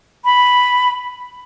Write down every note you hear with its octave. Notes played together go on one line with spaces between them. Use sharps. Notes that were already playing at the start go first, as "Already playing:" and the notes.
B5